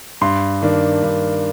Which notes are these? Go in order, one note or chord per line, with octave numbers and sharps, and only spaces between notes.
G2 C6
D#3 A#3 D4
G2